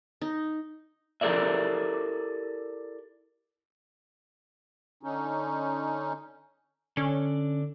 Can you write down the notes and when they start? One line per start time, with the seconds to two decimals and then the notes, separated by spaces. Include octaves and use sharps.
0.21 D#4
1.21 E4 G4 A4 A#4 D5 E5
5.03 D3 C#4 D#4
6.97 D3 C#4 D4